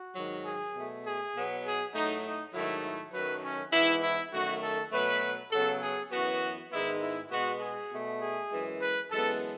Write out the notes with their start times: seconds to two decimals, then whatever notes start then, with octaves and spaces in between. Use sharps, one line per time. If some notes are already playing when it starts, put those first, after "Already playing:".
Already playing: F#4
0.15 G#2 D#3 F#3
0.45 G#4
0.75 B2 A3
1.04 G#4
1.34 B2 F#3 B3
1.64 G#4
1.94 A2 F#3 A3 D#4
2.24 D#4
2.54 G#2 D#3 F#3 A3 E4
2.83 E4
3.13 F#2 D#3 F#3 A3 B4
3.43 C#4
3.73 G#2 E3 B3 E4
4.03 E4
4.33 F#2 D#3 A3 F#4
4.63 A4
4.92 B2 F#3 A3 B4
5.52 C#3 F#3 B3 A4
5.82 G#4
6.12 F#2 E3 B3 F#4
6.71 G#2 D#3 G#3 B3 E4
7.01 E4
7.31 B2 G#3 B3 F#4
7.61 G#4
7.91 B2 A3
8.21 G#4
8.51 F#2 E3 G#3
8.80 B4
9.10 F#2 E3 G#3 B3 A4